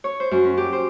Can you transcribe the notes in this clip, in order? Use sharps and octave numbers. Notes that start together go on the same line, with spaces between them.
C#5
C5
F#2
C#4
G4
C5